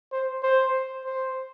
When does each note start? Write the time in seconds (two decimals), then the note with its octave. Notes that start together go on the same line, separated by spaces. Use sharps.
0.12 C5
0.43 C5
1.05 C5